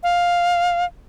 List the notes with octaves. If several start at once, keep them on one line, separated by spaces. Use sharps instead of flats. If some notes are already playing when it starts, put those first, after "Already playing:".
F5